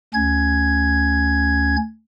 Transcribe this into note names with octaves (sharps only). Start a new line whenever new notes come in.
D2 C#4 G#6